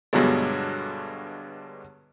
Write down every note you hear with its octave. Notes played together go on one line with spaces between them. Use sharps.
G2 B2 D3 F#3 G#3